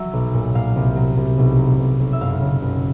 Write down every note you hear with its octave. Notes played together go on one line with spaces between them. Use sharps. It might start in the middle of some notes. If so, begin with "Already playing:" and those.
Already playing: F#3 E5
B1
A#2
A#2 F5
C2
F#3
C2
B1
F#3
B1
B1
E5
F#1 F5
C#3
F#1